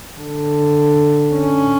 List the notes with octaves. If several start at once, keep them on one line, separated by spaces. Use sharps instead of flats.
D3
C#4